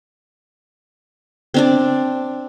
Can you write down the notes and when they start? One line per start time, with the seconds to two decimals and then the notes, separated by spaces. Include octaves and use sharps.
1.54 C4 D4 D5